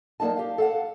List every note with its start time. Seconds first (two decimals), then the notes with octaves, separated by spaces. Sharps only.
0.20 F#3 G3 A#3 D#4 A5
0.37 G4 F5
0.58 A4 F5 F#5